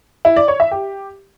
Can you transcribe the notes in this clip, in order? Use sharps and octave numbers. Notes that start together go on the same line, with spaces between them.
E4
D5
C#5
E5
G4